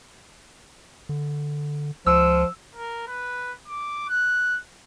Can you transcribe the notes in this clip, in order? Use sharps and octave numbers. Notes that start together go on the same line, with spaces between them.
D3
C#2 F3 E6
A#4
B4
D6
F#6